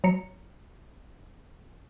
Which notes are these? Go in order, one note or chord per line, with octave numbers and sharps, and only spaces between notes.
F#3 A#5 C#7